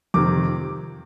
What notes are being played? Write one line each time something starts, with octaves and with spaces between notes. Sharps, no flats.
F2 C3 D#3 D6